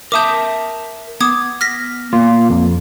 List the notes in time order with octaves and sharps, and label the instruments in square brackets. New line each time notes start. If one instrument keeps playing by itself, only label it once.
[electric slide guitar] A#4 E5 A5 [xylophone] D6 D#6 G6
[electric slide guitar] B3 [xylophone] D6 D#6 G#6
[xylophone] F6 A#6 B6
[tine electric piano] A#2 F4 [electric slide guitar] A#3
[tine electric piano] F2